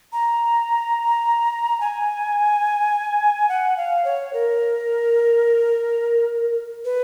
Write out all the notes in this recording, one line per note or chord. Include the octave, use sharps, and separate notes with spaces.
A#5
G#5
F#5
F5
C#5
A#4
B4